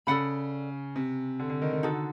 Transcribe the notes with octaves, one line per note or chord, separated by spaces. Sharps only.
C#3 A4 D5 F#5 B5
C3
D3
D3
D#3
D#3
D3 D#4 F#4 A4